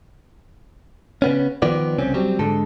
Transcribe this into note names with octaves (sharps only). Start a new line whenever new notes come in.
C#3 B3 C#4
D#3 F3 B3 D5
C2 C#3 C4 C#4
F#3 G3 C4
G#2 D3 G#3 A4